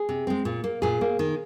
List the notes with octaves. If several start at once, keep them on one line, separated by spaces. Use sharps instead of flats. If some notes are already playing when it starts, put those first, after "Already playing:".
Already playing: G#4
C3
G#3 C4
A#2
A#3
A#2 G#4
A#3
D#3